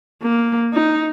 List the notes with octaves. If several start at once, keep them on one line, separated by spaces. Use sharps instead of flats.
A#3
D#4